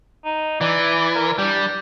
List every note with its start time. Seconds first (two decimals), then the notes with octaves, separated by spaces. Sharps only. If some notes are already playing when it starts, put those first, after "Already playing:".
0.25 D#4
0.61 E3 D5
1.15 A#4
1.38 G3 D4